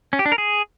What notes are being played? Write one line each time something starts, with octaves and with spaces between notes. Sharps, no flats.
C#4
G4
D4
A#4
G#4